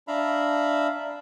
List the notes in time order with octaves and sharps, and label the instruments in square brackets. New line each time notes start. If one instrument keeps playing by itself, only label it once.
[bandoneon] D4 E5 F5 A#5 B5